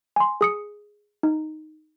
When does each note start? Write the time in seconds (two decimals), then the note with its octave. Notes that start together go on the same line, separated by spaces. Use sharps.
0.16 G#5 C6
0.41 G#4 D#6 C#7
1.23 D#4